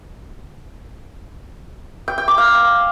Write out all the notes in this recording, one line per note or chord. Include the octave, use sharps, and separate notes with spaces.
G5
G5
D6
F5